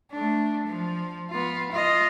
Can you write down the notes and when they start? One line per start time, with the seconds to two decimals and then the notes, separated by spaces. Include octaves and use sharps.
0.12 A3 D4
0.67 F3
1.30 B3 F4
1.72 F4 D#5